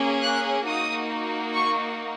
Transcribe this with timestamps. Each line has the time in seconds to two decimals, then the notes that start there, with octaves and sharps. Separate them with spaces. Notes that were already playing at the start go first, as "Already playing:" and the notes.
Already playing: A#3 C#4 G#4
0.23 F#6
0.67 A#3 D#4 F#4 D#6
1.54 C#6